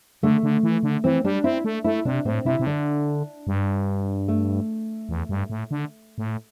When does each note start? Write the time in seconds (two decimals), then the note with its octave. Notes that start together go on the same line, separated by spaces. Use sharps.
0.23 D3 A3
0.43 D3
0.63 E3
0.83 D3
1.04 E3 C4
1.25 G3 D4
1.44 C4 E4
1.65 A3
1.84 A3 E4
2.05 C3 D4
2.25 A2 C4
2.45 C3 E4
2.60 C3
2.66 D3 D4
3.47 G2
4.28 A3
5.09 E2
5.29 G2
5.50 A2
5.71 D3
6.18 A2